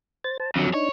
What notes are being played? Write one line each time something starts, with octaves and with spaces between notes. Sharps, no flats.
C5 A6
C5 A5
F2 D3 F#3
D4 D#4 C#5